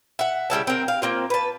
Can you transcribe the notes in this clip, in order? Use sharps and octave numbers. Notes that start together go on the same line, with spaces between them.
E5 F#5
C#3 G3 E4 A5
C4 A#4
F5
A#3 C4 F4
B4 A5